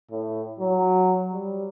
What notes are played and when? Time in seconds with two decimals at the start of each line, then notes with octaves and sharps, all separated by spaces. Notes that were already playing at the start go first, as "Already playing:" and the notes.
0.11 A2
0.60 F#3
1.32 G3